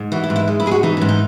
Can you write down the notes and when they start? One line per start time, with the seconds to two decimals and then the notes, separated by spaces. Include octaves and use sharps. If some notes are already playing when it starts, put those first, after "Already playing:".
Already playing: G#2
0.12 E3 F#4
0.24 E4
0.30 G#2
0.36 E4
0.48 G#3
0.60 E4
0.66 G#2 G#4
0.71 F#4
0.83 E3 D#4
0.97 G#2 C#4
1.09 D#4